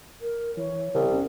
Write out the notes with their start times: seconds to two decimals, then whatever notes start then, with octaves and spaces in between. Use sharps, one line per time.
0.21 A#4
0.57 E3 C#5
0.94 C2 C#3
1.11 E1 C#4